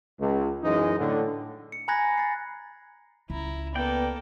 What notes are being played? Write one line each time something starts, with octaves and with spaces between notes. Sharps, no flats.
C#2
F#2 E3 G#3 D#4
A2 D3
C#7
G#5 A#5 B5 F#6 G#6 A#6
A6 C7
C#2 E4 A#5
A#3 B3 A4 D5 G5